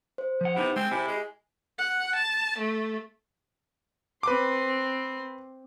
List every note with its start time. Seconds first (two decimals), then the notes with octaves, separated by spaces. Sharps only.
0.18 C5
0.41 F3 F#5
0.56 C3 B3 D#4 E4
0.76 G#3 C4
0.91 C3 E4 G4 G#5
1.08 G#3
1.79 F#5
2.16 A5
2.58 A3
4.23 C4 B4 C6 D6